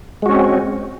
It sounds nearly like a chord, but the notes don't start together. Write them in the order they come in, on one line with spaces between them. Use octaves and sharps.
G#3 F#4 C#4 C4